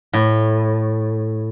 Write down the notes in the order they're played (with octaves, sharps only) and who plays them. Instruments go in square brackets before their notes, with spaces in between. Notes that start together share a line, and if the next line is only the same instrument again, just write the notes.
[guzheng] A2